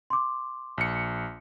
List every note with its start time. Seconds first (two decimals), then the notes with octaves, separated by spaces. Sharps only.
0.10 C6 D6
0.78 A#1 C#7